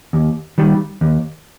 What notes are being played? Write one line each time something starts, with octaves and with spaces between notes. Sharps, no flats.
D#2
D#3 G3
D#2